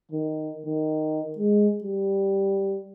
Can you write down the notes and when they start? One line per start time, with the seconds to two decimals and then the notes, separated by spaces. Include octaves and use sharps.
0.11 D#3
0.66 D#3
1.38 G#3
1.83 G3